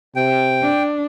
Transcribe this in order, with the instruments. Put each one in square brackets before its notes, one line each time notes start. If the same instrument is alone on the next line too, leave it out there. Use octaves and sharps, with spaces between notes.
[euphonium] C3 [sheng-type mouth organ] G5
[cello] D4